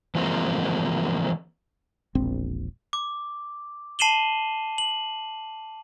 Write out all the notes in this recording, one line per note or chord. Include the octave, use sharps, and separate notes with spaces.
E3 F3 G#3 A#3 C4 A#4
E1 A#1 C4
D6
A5 C7 D#7 E7 F#7 G7
F#7